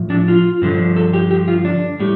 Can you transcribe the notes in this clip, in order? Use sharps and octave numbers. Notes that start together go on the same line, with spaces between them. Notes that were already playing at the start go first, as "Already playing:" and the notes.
Already playing: A2 F3
D4
F4
G2 D3 F3
A4
G4
G4
F4
D4
A2 G3